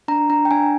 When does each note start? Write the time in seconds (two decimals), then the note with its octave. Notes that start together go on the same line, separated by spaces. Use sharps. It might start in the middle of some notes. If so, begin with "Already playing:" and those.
0.08 D4 A#5
0.30 D4 A#5
0.45 G5
0.51 D4 G#5